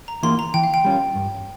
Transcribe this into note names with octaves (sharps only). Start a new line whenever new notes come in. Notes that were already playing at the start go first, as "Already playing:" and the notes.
A#5
E3 A#3 F4 C6
A#5
E3 G5
F5
G5
G3 C#4 F4
G2